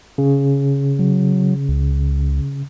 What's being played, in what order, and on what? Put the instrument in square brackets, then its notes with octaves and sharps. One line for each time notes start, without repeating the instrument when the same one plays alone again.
[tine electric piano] C#3
[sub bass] F#3
C#2